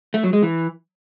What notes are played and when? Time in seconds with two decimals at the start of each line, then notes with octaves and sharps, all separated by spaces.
0.14 A3
0.24 F#3
0.33 G#3
0.43 E3